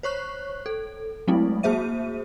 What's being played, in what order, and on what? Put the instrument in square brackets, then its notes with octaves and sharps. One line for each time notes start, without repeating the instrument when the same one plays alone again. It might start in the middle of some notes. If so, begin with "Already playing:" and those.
[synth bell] C5 C#5 C#6 F#6
A4
F#3 G#3 A3 C4 E4
A#3 F#4 G#4 C5 E5 D#7